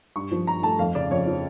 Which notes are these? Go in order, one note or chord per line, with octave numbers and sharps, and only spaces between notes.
G2 C#6
F3
G2 A#5
A3 A5
F2 F5
C#3 D5
F2 C#5
F3